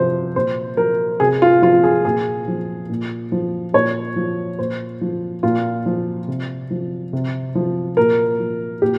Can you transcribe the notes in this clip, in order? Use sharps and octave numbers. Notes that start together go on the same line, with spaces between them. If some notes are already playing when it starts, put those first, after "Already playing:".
Already playing: C3 F3 C5
A#2 C5
F3 A#4
C3 G#4
F4
F3 F4
G#4
A#2 G#4
F3
A#2
F3
A#2 C#5
F3
A#2 C5
F3
A#2 F4
F3
C3
F3
C3
F3
A#2 A#4
F3
A#2 G4